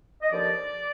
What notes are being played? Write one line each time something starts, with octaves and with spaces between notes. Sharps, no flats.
D#5
D#2 D3 F3 D5